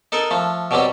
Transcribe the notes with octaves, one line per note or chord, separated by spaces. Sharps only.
D#4 A4 A#4
F3 A3
B2 F#3 G3 C4